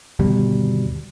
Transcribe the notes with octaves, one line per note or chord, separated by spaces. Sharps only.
G1 D#2 B2 G3